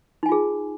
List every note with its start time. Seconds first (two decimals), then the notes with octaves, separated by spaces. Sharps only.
0.23 D#4
0.26 G#5
0.29 F4
0.32 G#4